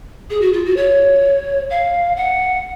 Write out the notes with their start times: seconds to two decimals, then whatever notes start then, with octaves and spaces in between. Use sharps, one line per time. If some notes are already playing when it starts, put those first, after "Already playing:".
0.30 G#4
0.41 F#4
0.53 F4
0.65 F#4
0.76 C#5
1.70 F5
2.16 F#5